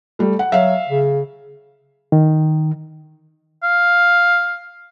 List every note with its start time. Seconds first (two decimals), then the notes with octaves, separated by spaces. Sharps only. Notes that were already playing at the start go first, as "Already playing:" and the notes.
0.19 G3 A3
0.39 F#5
0.52 F#3 E5 F5
0.88 C#3
2.12 D#3
3.63 F5